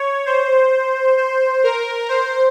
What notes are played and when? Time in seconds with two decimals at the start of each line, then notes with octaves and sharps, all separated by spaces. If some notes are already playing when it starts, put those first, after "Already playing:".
Already playing: C#5
0.26 C5
1.17 C5
1.64 A#4
2.09 C5